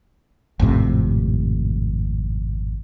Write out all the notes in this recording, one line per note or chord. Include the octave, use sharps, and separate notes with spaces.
G#1 F2 A2 C3